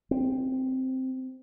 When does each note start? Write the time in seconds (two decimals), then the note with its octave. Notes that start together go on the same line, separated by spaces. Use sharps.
0.11 C4